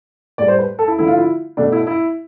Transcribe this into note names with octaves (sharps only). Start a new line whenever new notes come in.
A2 G3 D5
C5
B4
A4
E4
D3 F3 A3 E4
F4
E4
B2 A3 D4
E4
E4